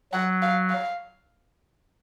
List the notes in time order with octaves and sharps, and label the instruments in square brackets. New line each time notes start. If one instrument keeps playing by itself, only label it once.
[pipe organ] F#3 [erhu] F#5
[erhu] F5
F5